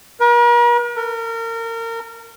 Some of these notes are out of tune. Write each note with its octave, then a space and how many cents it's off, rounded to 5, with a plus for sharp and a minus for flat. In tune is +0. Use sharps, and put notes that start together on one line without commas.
A#4 +45
A#4 -30